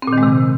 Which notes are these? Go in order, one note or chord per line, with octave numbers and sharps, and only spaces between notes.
C4
A#2
D#3
G#3
C3